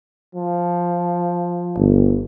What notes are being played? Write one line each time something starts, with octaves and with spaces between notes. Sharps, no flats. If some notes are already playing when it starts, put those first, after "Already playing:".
F3
G1